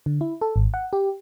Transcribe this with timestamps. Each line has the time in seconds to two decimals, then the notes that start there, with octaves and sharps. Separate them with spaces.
0.06 D3
0.21 E4
0.41 A4
0.56 G#1
0.74 F#5
0.93 G4